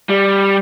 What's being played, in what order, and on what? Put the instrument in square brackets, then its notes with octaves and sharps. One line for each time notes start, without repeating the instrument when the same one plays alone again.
[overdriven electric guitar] G3